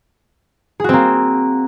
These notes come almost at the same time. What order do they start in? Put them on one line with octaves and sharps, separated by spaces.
G#4 F#4 C4 A#3